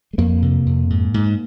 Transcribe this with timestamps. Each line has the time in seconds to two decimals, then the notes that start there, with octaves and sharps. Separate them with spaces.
0.13 G#3
0.18 F2 A#3
0.42 C3
0.66 F2
0.90 G#2
1.14 G#2